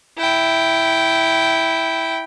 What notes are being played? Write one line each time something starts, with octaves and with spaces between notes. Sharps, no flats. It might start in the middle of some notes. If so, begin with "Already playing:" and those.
E4 G5